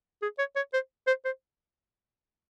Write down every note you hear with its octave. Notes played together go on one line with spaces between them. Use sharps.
G#4
C#5
C#5
C5
C5
C5